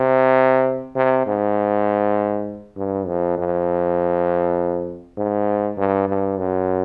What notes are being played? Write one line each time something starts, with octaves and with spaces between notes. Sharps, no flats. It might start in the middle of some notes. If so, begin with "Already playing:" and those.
Already playing: C3
C3
G#2
G2
F2
F2
G#2
G2
G2
F#2